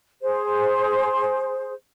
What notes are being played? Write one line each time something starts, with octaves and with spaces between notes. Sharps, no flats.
G#4 C5